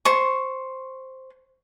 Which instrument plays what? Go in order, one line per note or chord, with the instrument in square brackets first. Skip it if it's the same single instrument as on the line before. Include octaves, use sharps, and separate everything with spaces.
[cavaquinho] C5 C#6